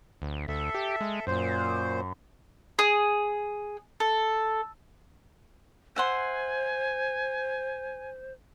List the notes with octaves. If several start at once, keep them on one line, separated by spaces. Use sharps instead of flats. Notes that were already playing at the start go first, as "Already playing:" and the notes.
D2
D2 A4 E5
G4
G#3
F#2 A#2 C5
G#4
A4
C5 E5 F#5 G#5 C6